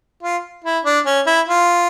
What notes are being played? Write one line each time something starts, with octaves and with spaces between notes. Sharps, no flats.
F4
E4
D4
C#4
E4
F4